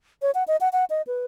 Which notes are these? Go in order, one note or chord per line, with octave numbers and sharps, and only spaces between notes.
C#5
F#5
D#5
F#5
F#5
D#5
B4